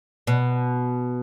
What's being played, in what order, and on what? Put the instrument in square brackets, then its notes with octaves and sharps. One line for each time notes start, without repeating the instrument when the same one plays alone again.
[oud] B2